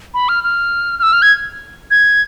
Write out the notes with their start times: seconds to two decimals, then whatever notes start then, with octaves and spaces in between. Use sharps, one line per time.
0.14 B5
0.29 F6
0.44 F6
0.99 F6
1.03 E6
1.13 F6
1.22 G#6
1.91 G#6